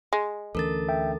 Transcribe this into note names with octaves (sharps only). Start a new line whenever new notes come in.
G#3
D2 E3 C#4 A4 A#4 A6
E5 G5